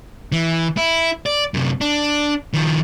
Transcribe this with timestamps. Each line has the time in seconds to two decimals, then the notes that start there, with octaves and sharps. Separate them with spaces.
0.32 E3
0.77 E4
1.26 D5
1.54 F#2 C3
1.81 D4
2.54 D#3 F3